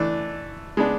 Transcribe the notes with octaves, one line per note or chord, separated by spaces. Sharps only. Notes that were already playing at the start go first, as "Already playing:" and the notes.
Already playing: E3 A3 D4
G#3 B3 D4